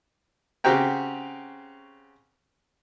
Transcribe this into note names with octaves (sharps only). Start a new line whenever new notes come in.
C#3 C4 F#4 G4 G5 A#5